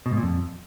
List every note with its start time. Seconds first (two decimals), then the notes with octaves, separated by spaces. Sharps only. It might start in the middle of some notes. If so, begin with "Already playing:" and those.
0.06 B2
0.11 G#2
0.17 A#2
0.23 F2